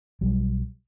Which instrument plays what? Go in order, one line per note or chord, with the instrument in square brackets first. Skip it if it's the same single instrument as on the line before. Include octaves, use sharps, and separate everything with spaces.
[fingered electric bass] B1 F#3 G3